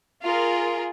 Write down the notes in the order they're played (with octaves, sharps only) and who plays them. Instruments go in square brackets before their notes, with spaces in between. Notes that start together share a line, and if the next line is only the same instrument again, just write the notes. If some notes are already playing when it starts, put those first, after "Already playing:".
[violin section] F4 G#4 A#4